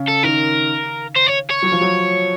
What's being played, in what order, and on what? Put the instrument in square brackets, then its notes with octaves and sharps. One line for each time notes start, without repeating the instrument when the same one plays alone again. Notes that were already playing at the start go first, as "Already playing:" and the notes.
Already playing: [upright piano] C#3
[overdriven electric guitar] A4
[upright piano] D#3 [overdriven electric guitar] A#4
[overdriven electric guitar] C5
C#5
C#5
[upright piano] F#3
F3
F#3